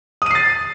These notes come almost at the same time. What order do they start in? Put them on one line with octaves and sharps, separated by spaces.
D#6 D#7 C7 A6